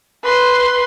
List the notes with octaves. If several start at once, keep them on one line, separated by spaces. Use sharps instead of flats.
B4 C6